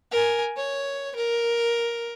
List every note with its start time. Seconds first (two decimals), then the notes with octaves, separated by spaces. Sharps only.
0.12 A#4 G#5
0.57 C#5
1.16 A#4